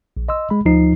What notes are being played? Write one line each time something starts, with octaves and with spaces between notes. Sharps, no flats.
A#1
D#5 C6 E6
G#3 B5
D2 F3 D#4 C7